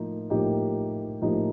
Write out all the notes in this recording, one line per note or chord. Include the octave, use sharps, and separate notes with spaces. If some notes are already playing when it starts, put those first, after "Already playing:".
Already playing: A2 F3 A#3 D#4
A2 F3 A#3 D#4 G4
A2 F3 A#3 D#4 G4